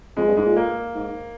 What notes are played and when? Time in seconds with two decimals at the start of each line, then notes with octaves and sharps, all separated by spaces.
0.17 F2 G#3
0.27 G2
0.37 G#2 G#3
0.46 A#2
0.56 A#3
0.95 G#2